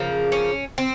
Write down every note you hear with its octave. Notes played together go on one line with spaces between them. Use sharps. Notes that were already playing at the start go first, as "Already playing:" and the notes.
Already playing: C#3 F3 A#3
C#4
C4